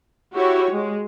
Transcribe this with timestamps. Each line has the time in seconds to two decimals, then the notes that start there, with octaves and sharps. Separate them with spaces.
0.35 E4 F#4 G4 C#5
0.71 G#3